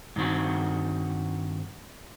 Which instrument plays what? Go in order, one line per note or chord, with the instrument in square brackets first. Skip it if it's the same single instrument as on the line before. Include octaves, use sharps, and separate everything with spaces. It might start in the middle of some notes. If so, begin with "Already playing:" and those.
[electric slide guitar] G2 D#3 C4 F#4